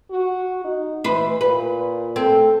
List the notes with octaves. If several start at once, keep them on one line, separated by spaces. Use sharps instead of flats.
F#4
D#4
E3 B4 C5
A#2 B4
C4 A4